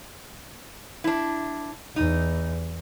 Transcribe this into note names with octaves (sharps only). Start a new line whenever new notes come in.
D4 E4
E2 D#4